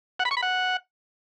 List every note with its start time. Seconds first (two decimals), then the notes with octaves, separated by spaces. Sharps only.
0.20 F#5
0.25 B5
0.31 C#6
0.37 B5
0.43 F#5